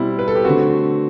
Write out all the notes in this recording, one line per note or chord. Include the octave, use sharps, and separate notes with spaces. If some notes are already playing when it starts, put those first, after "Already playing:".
Already playing: B2 G3 C4 E4
B4
A4
G4
D3 A3 C4 F#4